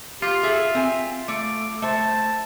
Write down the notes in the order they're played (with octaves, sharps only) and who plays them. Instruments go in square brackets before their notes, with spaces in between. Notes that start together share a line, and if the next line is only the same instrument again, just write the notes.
[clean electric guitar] F4 [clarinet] G4
[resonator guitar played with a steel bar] G#4 A4 [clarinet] E5
[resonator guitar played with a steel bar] C4 G#5
[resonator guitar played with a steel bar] A3 [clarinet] D6
[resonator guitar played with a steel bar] A3 C5 [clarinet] A5